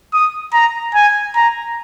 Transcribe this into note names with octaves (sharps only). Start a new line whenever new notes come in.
D#6
A#5
G#5
A#5